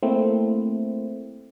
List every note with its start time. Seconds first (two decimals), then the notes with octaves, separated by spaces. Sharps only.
0.03 A3 A#3 C4 E4